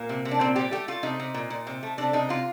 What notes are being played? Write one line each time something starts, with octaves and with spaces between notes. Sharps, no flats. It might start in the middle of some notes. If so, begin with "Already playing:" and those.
Already playing: A#2 A#3
C3
C3
D4
A#2 C4
G3 G4
A3 G4
A3 F4
C3 D#4
C3
A#2
A#2
C3
A3
C3 D4
C3 D#4
C3 F4